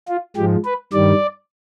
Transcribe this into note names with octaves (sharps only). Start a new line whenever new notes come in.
F4
G#2 F3 G#3 G4
B4
G2 D#3 G3 D5